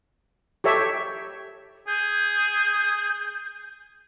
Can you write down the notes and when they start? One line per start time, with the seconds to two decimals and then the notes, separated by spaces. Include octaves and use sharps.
0.64 G4 A4 C#5 E5
1.88 G#4 G6